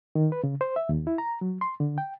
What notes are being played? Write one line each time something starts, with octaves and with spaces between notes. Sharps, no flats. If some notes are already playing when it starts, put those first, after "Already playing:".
D#3
B4
C#3
C5
E5
D#2
E4
A#5
F#3
C6
D3
G5